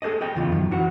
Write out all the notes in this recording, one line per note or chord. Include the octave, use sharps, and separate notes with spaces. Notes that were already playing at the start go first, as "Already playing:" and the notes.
G#4 A4 C5 D5 D#5
G#4 D#5 G5
E2 C#3 F4
F#2 D#3
E3 F#4